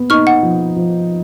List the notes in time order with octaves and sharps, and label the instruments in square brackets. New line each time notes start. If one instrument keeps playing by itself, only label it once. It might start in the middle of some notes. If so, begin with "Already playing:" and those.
Already playing: [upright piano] B3
[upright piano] D#4 [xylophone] C#6 F6
[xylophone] F#5
[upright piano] F3
F3